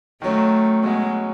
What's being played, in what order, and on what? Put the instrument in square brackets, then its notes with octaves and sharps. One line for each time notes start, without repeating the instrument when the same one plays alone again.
[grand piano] D#3 F#3 C#4 [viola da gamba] A3
[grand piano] B2 F#3 C#4 F#4 [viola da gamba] G#3